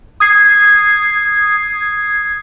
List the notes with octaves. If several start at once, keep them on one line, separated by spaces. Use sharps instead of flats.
D#6 G#6 C7